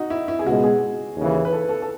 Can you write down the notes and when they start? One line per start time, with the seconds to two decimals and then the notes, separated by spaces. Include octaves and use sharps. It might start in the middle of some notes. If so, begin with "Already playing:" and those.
Already playing: D#4 F#4
0.10 E4
0.28 E4
0.39 G#4
0.46 C#2 B2 G#3 F#4
0.64 G#4
1.17 D#2 C#3 E3
1.45 B4
1.53 A4
1.69 A4
1.82 A4